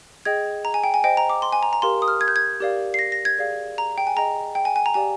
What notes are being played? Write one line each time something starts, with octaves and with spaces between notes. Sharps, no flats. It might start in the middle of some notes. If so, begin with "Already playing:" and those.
G#4 D#5 G5 G#6
A#5
G#5
G5
G#5
C5 D#5 G5
A#5
D6
C6
G#5
A#5
A#5
G4 A#4 F5 C6
D#6
F6
G#6
G6
G#6
G4 A#4 D5 F5
C7
A#6
A#6
G#6
G#4 D5 F5
A#5
G5
G#5
G#4 D#5 G5 A#5
G5
G#5
G#5
A#5
G4 D5 F5 G#5